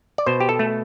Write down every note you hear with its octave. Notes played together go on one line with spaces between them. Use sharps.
D5
B2 C5
G4
A4
A3